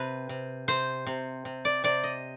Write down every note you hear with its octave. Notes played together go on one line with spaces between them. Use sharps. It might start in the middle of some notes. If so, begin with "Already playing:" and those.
Already playing: C3 B4
C3
C3 C5
C3
C3
D5
C3 D5
D#5